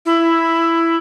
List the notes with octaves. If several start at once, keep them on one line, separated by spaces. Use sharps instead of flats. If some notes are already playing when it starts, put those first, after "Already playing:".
E4